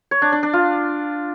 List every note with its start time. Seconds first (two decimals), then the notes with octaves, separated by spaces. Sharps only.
0.11 C#5
0.22 D4
0.32 D4
0.43 D4
0.53 F4